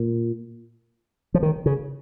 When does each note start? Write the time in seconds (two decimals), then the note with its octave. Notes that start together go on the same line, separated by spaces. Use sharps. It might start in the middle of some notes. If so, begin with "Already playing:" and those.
Already playing: A#2
1.34 F3
1.43 D#3
1.66 C#3